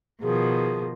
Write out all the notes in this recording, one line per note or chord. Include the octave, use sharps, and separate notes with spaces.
B2 D#3 F3 G#4